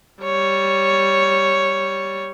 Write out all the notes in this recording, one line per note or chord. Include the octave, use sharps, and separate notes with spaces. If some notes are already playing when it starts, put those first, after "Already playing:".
G3 C#5